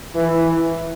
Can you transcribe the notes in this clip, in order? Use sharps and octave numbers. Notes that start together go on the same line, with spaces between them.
E3